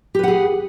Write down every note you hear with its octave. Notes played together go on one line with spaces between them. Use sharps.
G4 G#4 B4 F#5